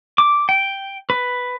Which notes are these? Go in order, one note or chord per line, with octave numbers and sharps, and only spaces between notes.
D6
G5
B4